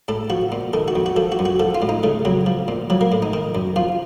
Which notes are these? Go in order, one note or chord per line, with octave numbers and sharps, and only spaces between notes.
A2 A4
F3 F#4
A#2
D#3 A4
F#4
F2
F#4
F3 A4
F#4
F#2
F#4
F3 A4
F4
A2
D#4
C#3 A3
F2 F#3
F3
A#2
F3 F#3
A#3
A2
D#4
D#3
F#2
F3 F4